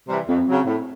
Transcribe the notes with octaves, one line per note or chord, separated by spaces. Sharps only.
C3 E3 G3
F2 C4
C#3 F#3
A2